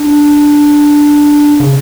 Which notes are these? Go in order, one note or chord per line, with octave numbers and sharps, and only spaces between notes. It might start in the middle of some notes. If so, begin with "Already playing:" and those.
Already playing: D4
C#3